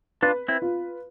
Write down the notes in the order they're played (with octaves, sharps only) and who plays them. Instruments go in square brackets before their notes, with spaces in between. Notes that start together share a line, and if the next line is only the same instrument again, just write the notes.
[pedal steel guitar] D4 F4 [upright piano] B4
[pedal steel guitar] C4 E4
[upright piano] F4